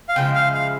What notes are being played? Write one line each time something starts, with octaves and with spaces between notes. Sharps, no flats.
F5
C#3 F3 G#3 E4 G5
F5
F5